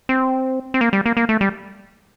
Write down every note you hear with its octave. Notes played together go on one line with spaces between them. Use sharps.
C4
C4
A#3
G3
A#3
A#3
A3
G3